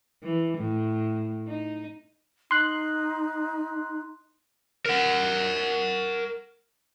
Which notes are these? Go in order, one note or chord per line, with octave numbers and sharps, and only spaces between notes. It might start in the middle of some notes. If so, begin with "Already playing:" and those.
E3
A2
D#4
D#4 C6 F#6
A#4 F#5